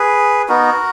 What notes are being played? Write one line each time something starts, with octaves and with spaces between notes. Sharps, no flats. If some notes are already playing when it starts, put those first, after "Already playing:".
Already playing: G#4 B4
B3 D#4 F#4 A#4